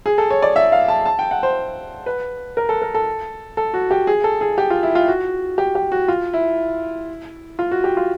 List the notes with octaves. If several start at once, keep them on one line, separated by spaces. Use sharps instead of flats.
G#4
A4
C#5
D5
E5
F5
A5
A5
G5
F#5
C5
B4
A#4
A4
A#4
A4
A4
F#4
G4
G#4
A4
G#4
G4
F4
E4
F4
F#4
G4
G4
F#4
F4
E4
F4
F#4
G4
F4